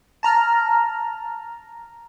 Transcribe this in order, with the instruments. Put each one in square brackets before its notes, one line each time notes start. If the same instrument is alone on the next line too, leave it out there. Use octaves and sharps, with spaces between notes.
[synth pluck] A5 A#5 F6